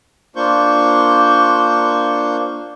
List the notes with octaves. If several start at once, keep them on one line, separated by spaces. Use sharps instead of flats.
A#3 D4 F4 C5 C#6 G6